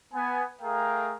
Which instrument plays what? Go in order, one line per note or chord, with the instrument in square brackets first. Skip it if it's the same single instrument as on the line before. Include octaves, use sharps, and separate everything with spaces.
[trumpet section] B3 G#5
A3 G#4 A#4 F5 G5 A#5